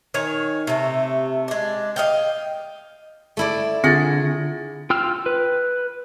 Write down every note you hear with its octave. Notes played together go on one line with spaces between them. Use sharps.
D#3 C#5 G#5
C3 A3
G#3 D4
D#5 F5 G5
A3 E4 D5
D3 C4 F4 G#4 A6
F4 G5 E6 F6
B4